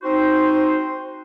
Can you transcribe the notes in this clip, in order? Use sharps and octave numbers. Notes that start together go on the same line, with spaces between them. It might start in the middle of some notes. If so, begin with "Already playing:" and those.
C4 D#4 F#4 C5